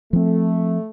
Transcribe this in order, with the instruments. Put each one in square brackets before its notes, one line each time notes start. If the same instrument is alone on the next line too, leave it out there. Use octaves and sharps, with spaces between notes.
[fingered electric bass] F3 C4 [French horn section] A3